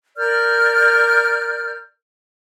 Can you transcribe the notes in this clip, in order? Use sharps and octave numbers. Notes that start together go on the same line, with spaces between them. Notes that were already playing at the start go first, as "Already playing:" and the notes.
A#4 D5 F6 G6